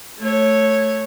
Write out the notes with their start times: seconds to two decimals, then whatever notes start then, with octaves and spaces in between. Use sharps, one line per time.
0.19 A3 C#5